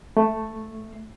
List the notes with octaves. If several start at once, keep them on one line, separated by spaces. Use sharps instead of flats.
A3